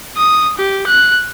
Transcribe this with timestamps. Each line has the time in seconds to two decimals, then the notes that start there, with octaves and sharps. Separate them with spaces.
0.17 D#6
0.58 G4
0.87 F#6